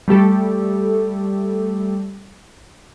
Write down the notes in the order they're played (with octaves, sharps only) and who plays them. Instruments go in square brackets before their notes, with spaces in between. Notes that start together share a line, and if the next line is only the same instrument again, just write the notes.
[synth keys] G3 A3 G4 A4